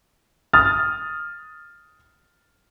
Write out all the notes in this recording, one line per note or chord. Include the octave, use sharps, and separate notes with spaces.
D#6 F6 A6